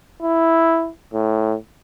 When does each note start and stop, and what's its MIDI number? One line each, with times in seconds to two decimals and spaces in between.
0.22 0.89 64
1.14 1.56 45